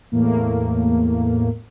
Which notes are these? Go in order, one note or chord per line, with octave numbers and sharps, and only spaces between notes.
E2 A2 A#3